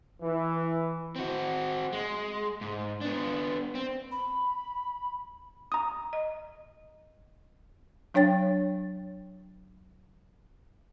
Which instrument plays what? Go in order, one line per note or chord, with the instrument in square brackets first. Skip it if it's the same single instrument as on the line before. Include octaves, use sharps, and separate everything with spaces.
[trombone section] E3
[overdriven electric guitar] C4 F#4
G#3
G#2
B3 D4
C4
[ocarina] B5
[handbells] A#5 D#6
[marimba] D#5
F#3 D4 C#5 G5 A6